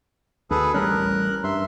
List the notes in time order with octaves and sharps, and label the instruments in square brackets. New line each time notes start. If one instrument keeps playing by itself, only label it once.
[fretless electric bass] D2 [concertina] G#4 A4 B4
[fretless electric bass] A1 G3 C#4 [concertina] A#4 F#6
[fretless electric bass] G2 [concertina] E5 C6